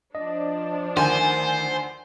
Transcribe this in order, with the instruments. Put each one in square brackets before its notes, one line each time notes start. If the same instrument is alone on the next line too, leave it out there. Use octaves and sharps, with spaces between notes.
[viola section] F3 D4 [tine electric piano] D#5
[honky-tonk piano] D2 G#5 [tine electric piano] D#3 [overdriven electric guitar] C5